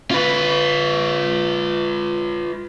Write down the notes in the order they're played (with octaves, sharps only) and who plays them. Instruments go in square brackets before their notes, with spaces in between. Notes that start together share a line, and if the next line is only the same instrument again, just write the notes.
[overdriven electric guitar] F4 B4